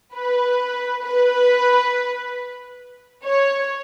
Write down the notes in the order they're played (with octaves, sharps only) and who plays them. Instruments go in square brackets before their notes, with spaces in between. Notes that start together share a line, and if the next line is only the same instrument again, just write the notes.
[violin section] B4
B4
C#5